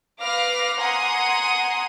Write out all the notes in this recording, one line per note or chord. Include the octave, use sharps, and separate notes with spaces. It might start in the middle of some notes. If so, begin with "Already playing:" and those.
B4 F5 D6 F6 A#6
F#5 G#5 A#5 C6 D#6